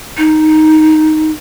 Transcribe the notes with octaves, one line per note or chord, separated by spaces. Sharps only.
D#4